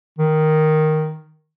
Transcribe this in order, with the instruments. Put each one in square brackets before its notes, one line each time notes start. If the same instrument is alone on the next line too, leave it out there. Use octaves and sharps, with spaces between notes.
[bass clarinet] D#3